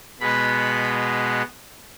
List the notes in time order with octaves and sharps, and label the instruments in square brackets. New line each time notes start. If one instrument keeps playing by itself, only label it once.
[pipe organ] B2 G#3 B3 B5